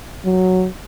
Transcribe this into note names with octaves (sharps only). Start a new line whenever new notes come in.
F#3